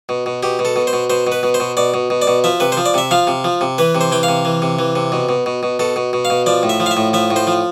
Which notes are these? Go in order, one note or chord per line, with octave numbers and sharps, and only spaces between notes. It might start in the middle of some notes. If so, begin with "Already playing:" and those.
B2
B2
B2 G4
B2
A4
B2
C5
B2
B2 C5
B2
B4
B2
C5
B2
B2 D5
B2
B2
D5
B2
F3 E5
C3 B4
C5
F3
D5
C3 E5
F3 F5
C3
F3
C3
E3 B4
C3
C5
E3 G5
F5
C3
E3
C3
E3
C3
B2
B2
B2
B2
B2 A4
B2
B2
F5
B2
F3 D5
A2
E5
F3
F5
E5
A2
F3 E5
A2
C5
F3